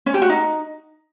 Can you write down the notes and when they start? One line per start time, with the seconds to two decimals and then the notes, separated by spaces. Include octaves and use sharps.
0.06 C#4
0.14 G4
0.22 F#4
0.29 D#4